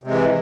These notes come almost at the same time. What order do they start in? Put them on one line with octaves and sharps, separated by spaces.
C3 G#3 E3